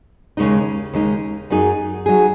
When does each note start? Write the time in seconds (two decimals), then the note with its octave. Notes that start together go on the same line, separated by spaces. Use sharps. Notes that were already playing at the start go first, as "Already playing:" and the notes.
0.37 D#2 C#3 G#3 D#4
0.93 D#2 C#3 G#3 D#4
1.50 F#2 F#3 D#4 G#4
2.06 F#3 D#4 G#4